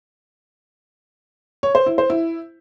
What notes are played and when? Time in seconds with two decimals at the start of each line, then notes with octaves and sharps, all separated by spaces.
1.63 C#5
1.75 C5
1.86 E4
1.98 C5
2.10 E4